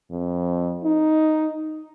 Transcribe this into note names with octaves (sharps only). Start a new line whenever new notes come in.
F2
D#4